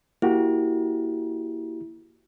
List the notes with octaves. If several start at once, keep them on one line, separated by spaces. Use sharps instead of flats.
A#3 E4 F#4 G4